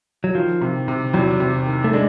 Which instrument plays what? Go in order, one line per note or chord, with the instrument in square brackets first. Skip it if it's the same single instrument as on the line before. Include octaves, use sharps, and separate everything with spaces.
[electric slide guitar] F#3
[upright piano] D#3 [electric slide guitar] F3
[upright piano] C3
C3
[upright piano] E2 [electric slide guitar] F#3
[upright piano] C3
D#3
[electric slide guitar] A3
[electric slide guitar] G#3 [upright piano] D4